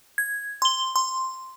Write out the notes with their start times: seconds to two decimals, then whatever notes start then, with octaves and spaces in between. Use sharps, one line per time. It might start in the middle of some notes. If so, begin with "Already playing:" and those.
0.18 G#6
0.62 C6 G7
0.96 C6